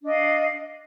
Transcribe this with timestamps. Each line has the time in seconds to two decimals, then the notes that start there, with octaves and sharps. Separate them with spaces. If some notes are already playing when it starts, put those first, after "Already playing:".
0.01 D4
0.05 D#5
0.10 F5